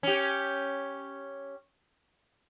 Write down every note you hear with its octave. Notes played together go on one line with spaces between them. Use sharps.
C#4 G4